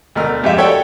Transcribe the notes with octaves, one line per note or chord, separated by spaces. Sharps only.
D2 B2 A3 A#4 F6
F2 G#3 G4 E5 F5
F#4 G4 A4 C#5 D5 G5